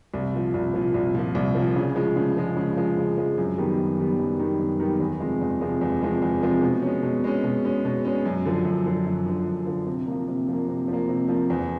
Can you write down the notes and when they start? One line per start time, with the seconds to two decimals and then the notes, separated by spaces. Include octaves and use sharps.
0.14 C2
0.33 A#2 F3
0.54 C2
0.74 A#2 F3
0.94 C2
1.15 A#2 F3
1.35 C2
1.55 A#2 F3
1.76 C#3
1.96 F3 G#3
2.16 C#3
2.37 F3 G#3
2.56 C#3
2.77 F3 G#3
2.97 C#3
3.18 F3 G#3
3.38 F#2
3.58 D#3 G3 B3
3.79 F#2
3.99 D#3 G3 B3
4.19 F#2
4.39 D#3 G3 B3
4.59 F#2
4.80 D#3 G3 B3
5.00 E2
5.20 C3 F3 G#3
5.41 E2
5.61 C3 F3 G#3
5.81 E2
6.02 C3 F3 G#3
6.22 E2
6.43 C3 F3 G#3
6.62 B2
6.82 G#3 C#4
7.03 B2
7.24 G#3 C#4
7.44 B2
7.64 G#3 C#4
7.85 B2
8.05 G#3 C#4
8.25 F#2
8.45 D3 F3
8.65 F#2
8.86 D3 F3
9.06 F#2
9.26 D3 F3
9.46 F#2
9.67 D3 F3
9.86 C3
10.07 F3 A#3
10.28 C3
10.48 F3 A#3
10.68 C3
10.88 F3
10.93 A#3
11.09 C3
11.29 F3 A#3
11.50 E2